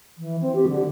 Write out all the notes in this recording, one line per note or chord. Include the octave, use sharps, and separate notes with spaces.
E3
C4
G4
D3